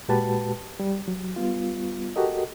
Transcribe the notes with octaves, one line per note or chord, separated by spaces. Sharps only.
A#2 G#3 F#4 G4 B4 A5
G3
F#3
G3 B3 F4
F#4 G4 A4 A#4 D#5